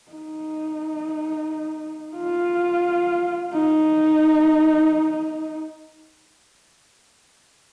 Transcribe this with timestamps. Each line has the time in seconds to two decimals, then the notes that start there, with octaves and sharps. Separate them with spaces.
0.12 D#4
2.17 F4
3.54 D#4